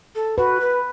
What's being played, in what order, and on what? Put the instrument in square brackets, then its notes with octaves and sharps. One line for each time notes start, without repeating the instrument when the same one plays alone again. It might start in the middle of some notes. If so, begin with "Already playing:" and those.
[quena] A4
[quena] F#4 [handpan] B4
[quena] B4